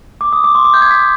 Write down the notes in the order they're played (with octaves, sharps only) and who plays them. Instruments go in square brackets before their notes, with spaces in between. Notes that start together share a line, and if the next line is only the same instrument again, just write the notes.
[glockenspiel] D6
D#6
D6
C6
D6
G6
G#6
B6